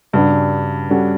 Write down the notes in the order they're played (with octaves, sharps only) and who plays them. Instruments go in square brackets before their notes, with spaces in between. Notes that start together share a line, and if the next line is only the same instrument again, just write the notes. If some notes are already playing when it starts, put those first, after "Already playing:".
[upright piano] G2 [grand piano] C#3 G3 D4 F#4 B4
[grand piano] G3 C#4 F#4 A4